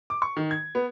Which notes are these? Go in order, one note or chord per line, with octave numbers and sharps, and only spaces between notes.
D6
C#6
D#3
G#6
B3